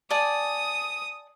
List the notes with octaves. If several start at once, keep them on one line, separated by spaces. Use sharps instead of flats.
D5 G#5 A5 D#6